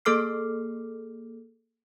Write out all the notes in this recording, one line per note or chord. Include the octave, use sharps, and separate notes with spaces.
A#3 G#4 A4 D6 F6 C7